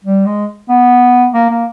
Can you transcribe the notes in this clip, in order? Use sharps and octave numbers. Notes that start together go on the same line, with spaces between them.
G3
G#3
B3
A#3
A#3